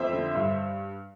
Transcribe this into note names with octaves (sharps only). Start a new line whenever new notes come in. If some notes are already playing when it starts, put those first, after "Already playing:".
Already playing: F2 C5 E5
D3
G2